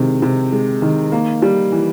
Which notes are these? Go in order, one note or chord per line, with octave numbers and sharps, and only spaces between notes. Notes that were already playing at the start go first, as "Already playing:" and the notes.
Already playing: C3 D#3 G#3
C3
G#3
D#3
A#3
G3
E3